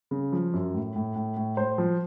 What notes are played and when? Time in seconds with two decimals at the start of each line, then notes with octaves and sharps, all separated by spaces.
0.11 C#3
0.32 F3
0.53 F#2
0.74 A2
0.96 A2
1.16 A2
1.37 A2
1.57 A2 C5
1.78 F3